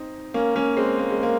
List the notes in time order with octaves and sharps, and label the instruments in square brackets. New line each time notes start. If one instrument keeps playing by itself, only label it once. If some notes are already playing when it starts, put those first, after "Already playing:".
Already playing: [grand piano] C4 D#4
A#3 C#4
A#3 C#4
G#3 C4
A#3
G#3
A#3